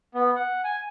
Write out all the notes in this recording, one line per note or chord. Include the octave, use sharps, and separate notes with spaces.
B3
F#5
G#5